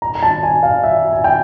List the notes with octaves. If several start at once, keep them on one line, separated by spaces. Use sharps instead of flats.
A#5
A#5
A5
G#5
F5
E5
G#5
G5